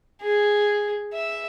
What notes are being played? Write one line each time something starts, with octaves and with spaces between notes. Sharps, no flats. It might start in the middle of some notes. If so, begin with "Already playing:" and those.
G#4
E5